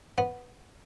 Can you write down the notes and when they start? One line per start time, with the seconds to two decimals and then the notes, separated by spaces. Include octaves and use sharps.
0.18 B3